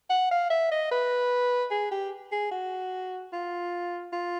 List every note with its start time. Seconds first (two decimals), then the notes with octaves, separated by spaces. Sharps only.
0.10 F#5
0.31 F5
0.50 E5
0.72 D#5
0.92 B4
1.71 G#4
1.91 G4
2.32 G#4
2.52 F#4
3.33 F4
4.13 F4